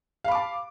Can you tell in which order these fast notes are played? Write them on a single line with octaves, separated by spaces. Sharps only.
F5 B5 D6 A5